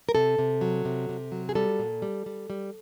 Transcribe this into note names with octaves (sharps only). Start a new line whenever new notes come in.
A#4
C3 A4
C3
F#3
C3
C3
F#3
G#4
G3 A4
A#2
G3
G3
G3